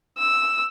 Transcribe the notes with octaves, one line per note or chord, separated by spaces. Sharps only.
E6